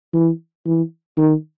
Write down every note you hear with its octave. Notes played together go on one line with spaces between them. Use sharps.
E3
E3
D#3